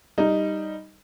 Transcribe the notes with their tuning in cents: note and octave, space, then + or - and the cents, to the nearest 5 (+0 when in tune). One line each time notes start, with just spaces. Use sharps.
G3 +0 D#4 +0